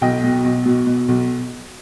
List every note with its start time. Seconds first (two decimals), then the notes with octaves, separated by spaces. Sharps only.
0.01 B1 D#5 G5
0.24 B2
0.44 B1
0.65 B2
0.87 B2
1.08 B1